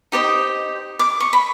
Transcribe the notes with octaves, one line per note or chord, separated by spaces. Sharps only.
D#4 G4 C5 D#5
D6
C#6
B5